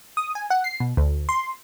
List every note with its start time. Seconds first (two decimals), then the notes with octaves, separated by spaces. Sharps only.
0.17 D#6
0.35 G#5
0.50 F#5
0.64 C7
0.80 B2
0.97 D2
1.29 C6